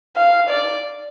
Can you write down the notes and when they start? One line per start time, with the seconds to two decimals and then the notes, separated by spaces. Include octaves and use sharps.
0.17 F5
0.49 D5